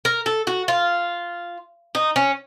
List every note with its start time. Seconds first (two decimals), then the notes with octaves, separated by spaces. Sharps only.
0.05 A#4
0.26 A4
0.47 F#4
0.68 F4
1.95 D#4
2.16 C#4